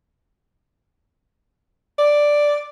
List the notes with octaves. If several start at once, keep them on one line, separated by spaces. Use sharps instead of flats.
D5